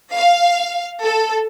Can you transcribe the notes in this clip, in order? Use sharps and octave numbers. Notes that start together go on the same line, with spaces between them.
F5
A4